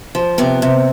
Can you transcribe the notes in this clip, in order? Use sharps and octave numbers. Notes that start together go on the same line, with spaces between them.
F3
C3 B3
C3